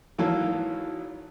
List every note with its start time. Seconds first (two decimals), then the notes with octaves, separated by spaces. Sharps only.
0.18 G#1 E3 F#3 A#3 A4